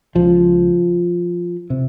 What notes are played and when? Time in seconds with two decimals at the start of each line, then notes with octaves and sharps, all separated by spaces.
0.15 C#2 C#3 F3
1.70 C3